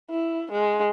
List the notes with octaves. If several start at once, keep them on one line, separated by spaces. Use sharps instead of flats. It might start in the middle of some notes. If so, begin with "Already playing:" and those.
E4
G#3